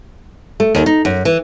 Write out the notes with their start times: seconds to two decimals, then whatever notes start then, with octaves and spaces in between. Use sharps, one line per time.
0.60 A3
0.75 D#2
0.86 D#4
1.05 F#2
1.25 E3